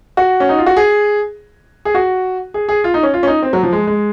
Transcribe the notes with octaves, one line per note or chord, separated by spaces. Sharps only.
F#4
C#4
D#4
F4
F#4
G#4
G#4
F#4
G#4
G#4
F4
D#4
C#4
F4
C#4
D#4
C4
F#3
F3
G#3
G#3